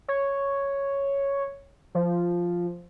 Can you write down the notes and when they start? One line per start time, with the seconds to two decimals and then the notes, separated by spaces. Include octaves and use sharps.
0.08 C#5
1.95 F3